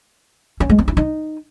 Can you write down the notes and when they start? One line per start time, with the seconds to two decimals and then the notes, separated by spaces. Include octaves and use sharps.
0.60 C#4
0.69 G#3
0.79 C4
0.88 E4
0.97 D#4